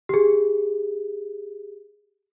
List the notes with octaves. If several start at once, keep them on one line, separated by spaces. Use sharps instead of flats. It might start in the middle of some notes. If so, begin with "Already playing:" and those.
G4 G#4